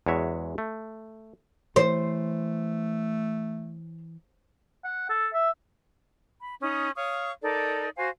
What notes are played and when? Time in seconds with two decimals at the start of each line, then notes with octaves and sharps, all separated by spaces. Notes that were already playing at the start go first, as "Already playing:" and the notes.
0.06 E2 G#3 F#4 C#5 E5
0.58 A3
1.76 E3 A3 C5
4.85 F#5
5.10 A4
5.33 E5
6.43 B5
6.61 C#4 D#4 D#6
6.96 C#5 F5 C#6 D#6
7.42 D#4 A4 A#4 D5
7.97 F#4 C5 F5 G#5